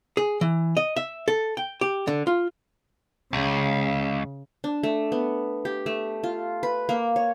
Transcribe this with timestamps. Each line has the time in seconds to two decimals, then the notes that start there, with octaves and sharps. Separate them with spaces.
0.17 G#4
0.41 E3
0.77 D#5
0.96 E5
1.28 A4
1.57 G5
1.81 G4
2.08 D3
2.27 F4
3.33 C#2 C#3
4.64 D4
4.83 A3
5.12 B3
5.65 G4
5.86 A3
6.23 F4
6.63 B4
6.89 A#3
7.16 C#5